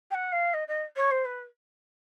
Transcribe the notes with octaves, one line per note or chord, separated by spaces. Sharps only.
G5
F#5
F5
D#5
D#5
C#5
C5
B4